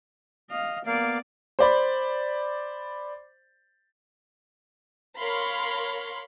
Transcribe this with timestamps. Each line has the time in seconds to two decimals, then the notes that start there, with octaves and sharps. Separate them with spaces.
0.50 D#5 F5
0.86 A#3 B3 D5 F5
1.59 C5 D5 B5
5.19 A#4 C#5 F5 B5 C6